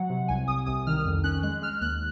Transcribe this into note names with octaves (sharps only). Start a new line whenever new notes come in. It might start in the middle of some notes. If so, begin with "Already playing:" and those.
Already playing: F#3 F#5
C3
C2 G#5
C2 D#6
C2 D#6
D#3 F6
F2
C#4 F#6
G#3 F#6
G#3 F6
D#2 F#6